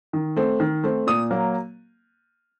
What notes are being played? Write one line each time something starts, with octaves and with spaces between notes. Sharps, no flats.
D#3
A3 C4
D#3
A3 C4
A#2 D#6
F#3 A#3